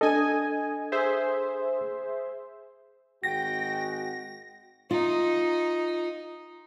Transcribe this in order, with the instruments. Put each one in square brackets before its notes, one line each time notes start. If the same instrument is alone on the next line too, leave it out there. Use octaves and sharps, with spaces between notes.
[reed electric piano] D4 A4 [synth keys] D#5 G#5
[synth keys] G#4 C5 E5
[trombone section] G#1 G#3 F#4 [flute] G5 [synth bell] A#6
[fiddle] D#4 [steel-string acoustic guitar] F4